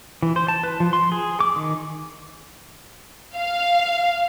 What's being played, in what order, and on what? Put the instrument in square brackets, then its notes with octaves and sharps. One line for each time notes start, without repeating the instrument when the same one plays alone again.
[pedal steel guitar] E3
C5
A5
B4
F3
C6
G#4
D6
D#3
[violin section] F5